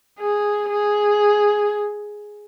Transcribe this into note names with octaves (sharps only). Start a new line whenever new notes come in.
G#4
G#4